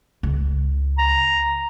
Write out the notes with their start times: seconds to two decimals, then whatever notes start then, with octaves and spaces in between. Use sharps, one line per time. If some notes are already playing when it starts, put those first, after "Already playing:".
0.23 C#2
0.98 A#5